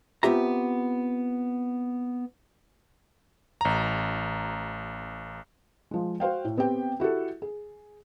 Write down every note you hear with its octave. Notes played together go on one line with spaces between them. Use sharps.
B3 C4 F4 G4 E5 A#5
A1 A#5
F3 G#3
F#4 C5 F5 G5
A2
B3 C4 G4 G5
E4 F#4 G4 A4
G#4